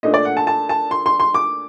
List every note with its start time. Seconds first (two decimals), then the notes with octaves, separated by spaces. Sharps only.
0.03 A#2 A3 D4 D#5
0.14 D5
0.25 F#5
0.37 A5
0.47 A5
0.69 A5
0.91 C6
1.06 C6
1.20 C6
1.34 D6